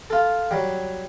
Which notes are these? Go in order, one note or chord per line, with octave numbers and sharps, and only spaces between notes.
F4 A4
F#3 G3